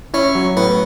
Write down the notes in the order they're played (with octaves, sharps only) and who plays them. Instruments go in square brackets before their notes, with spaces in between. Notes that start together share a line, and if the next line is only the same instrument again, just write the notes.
[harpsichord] C#4 [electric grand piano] E4
[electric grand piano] F#3
[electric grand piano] A2 [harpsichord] B3